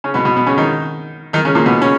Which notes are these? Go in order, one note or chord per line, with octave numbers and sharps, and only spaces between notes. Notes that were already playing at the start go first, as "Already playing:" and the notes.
C#3 C#4
B2 B3
B2 B3
B2 B3
C#3 C#4
D#3 D#4
D#3 D#4
C#3 C#4
A#2 A#3
B2 B3
C#3 C#4